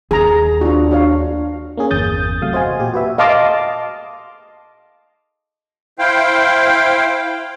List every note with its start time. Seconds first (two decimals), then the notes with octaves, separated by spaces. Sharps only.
0.11 D#2 G#4 A#5
0.61 D4 F4 F#4
0.91 F#4 C#5 F5
1.77 A#3 C#4 G#4
1.91 G1 E2 D#6 G6 A6
2.42 E2 C3 F#3 A3 F5 D#6
2.53 F#4 C5 D#5 F5 G#5
2.79 A#2 G4 G#5
2.94 F#4 B4 E5
3.18 D#5 F5 A5 C6 D6
5.99 E4 C5 F5 G5